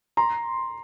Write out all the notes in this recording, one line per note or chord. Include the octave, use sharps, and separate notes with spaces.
A#5 C6